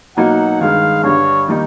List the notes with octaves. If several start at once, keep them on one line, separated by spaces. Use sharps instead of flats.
B2 F#3 A#3 D#4 F#5
G2 D#3 G#3 F5
G2 D3 G3 C#5
D#3 G3 A#3 D#4